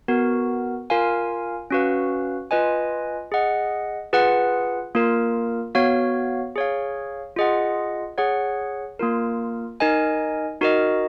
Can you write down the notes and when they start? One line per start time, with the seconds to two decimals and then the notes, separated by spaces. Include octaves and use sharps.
0.08 B3 F#4 A#4
0.90 F4 A#4 F5 G#5
1.71 C#4 F#4 B4 F5
2.51 F4 B4 D#5 G#5
3.32 G#4 D#5 F#5
4.13 F4 G#4 B4 F#5
4.95 A#3 F4 A#4
5.75 B3 F#4 C#5 F5
6.56 G#4 C#5 F5
7.37 F4 G#4 D#5 F#5
8.18 G#4 C#5 F#5
8.99 A#3 F4 A#4
9.80 D#4 A#4 D#5 G#5
10.61 D#4 F#4 A#4 D#5